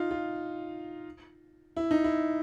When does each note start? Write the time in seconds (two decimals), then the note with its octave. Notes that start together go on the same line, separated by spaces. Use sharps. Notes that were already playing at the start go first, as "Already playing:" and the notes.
Already playing: D#4 F4
0.11 F4
1.77 E4
1.91 D#4
2.04 E4